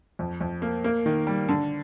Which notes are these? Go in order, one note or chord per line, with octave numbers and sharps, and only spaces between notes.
F2
F2
A#3
A#3
D#3
G3
D3